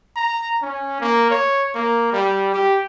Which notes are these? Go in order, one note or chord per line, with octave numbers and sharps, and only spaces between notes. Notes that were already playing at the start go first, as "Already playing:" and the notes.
A#5
C#4
A#3
C#5
A#3
G3
G4